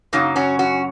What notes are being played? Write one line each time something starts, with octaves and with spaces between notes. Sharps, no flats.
F#2 C#3 F#3 A#3 D#4
C#4 F#4
C#4 F#4